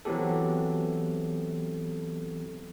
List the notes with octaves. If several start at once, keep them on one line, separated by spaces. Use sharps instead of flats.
E3 F#3 B3 C4 G4 A4